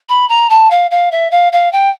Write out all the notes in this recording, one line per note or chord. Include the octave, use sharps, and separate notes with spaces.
B5
A#5
A5
F5
F5
E5
F5
F5
G5